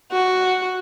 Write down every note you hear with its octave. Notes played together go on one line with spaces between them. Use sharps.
F#4